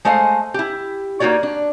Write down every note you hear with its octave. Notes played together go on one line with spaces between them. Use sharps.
G#3 A3 C5 D#5 F5
E4 G4
A#3 D#4 F#4 C#5 D5
D4